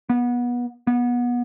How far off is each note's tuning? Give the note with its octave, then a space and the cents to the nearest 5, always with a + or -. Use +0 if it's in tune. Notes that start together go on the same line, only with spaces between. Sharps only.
B3 -25
B3 -25